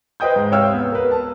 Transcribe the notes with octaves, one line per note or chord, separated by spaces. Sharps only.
B4 C5 D#5 G5 D#6 G6
G#2
C3 C#5 F5 G5 E6 F6
B3
A#4 B4
A5